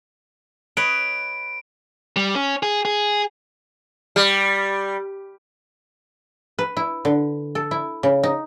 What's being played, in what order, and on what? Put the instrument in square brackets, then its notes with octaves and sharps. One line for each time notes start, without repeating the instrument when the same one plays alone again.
[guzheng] B4 C#5 D#5 [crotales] D7
[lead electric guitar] G3
C#4
G#4
G#4
[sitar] G3
[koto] B4
E4
D3
A4
E4
C#3
D#4